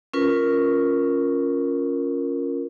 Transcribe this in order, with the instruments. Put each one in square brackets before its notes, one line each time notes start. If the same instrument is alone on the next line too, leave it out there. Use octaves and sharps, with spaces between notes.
[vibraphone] C#4 F4 A#4 B4